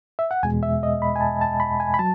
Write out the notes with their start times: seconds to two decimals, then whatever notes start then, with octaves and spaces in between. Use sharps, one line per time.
0.19 E5
0.31 F#5
0.43 E2 B2 G#3 G#5
0.63 E5
0.83 D#5
1.02 B5
1.16 G#5
1.21 A5
1.41 A5
1.60 B5
1.80 G#5
1.94 B5
1.99 F#3 A5